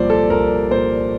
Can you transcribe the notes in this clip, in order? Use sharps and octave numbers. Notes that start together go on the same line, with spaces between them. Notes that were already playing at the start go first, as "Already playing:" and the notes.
Already playing: C2 A#2 F3 C5 D5
A4
C2 A#4
A#2 F3 C5